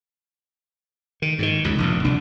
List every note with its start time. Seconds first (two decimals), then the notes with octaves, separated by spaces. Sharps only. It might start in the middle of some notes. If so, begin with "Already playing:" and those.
1.22 D#3
1.39 G#2 C3 D#3
1.64 C#2 F#2
1.78 F1 A#1 A#2
2.04 C2 D4